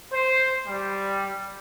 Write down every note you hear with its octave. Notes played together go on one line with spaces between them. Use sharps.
C5
G3